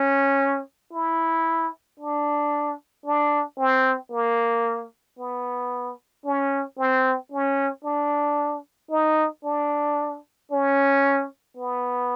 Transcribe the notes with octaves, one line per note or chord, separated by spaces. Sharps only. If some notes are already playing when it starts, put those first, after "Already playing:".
Already playing: C#4
E4
D4
D4
C4
A#3
B3
C#4
C4
C#4
D4
D#4
D4
C#4
B3